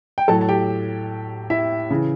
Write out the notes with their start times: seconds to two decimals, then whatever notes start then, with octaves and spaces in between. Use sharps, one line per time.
0.18 G5
0.28 A2 F#3 A4 A5
0.41 A5
0.49 G4 G5
1.50 E4 E5
1.90 C#3 E3